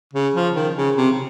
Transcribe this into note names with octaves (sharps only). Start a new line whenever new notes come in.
C#3
F3
D#3
C#3
C3